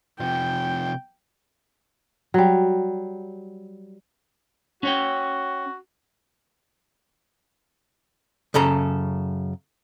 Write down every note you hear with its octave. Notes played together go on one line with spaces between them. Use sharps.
C3 F3 G5
F#3 G3
C#4 F#4 C#5 G5
F#2 C#3 A4 A#5